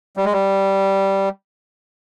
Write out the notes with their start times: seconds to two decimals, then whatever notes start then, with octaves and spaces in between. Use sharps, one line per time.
0.17 G3
0.25 G#3
0.33 G3